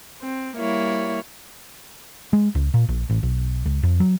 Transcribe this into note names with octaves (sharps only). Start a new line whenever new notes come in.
C4
G3 A#3 E4 C#5
G#3
C#2
A#2
A#1
A1
B1
C#2
F2
F#3